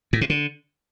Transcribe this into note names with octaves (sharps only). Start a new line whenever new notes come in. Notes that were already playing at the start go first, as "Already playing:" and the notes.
A2
C3
D3